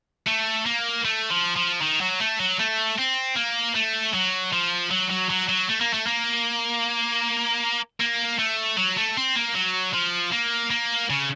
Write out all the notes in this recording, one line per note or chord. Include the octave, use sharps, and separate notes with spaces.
A3
A#3
A3
F3
F3
D#3
F#3
A3
F#3
A3
C4
A#3
A3
F#3
F3
F#3
F#3
F#3
F#3
A3
A#3
A3
A#3
A#3
A3
F#3
A3
C4
A#3
F#3
F3
A#3
A#3
C#3